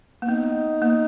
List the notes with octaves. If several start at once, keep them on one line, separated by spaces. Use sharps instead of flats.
A#3
B3 D#4
A#3